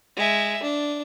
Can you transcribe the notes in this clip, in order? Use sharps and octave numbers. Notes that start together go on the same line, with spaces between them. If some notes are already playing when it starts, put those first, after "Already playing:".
G#3 E5
D4